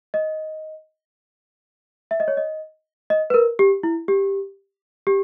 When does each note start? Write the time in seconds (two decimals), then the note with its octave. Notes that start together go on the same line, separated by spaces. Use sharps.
0.14 D#5
2.11 E5
2.20 D#5
2.28 C#5
2.37 D#5
3.10 D#5
3.30 B4
3.34 A#4
3.59 G4
3.83 E4
4.08 G4
5.07 G4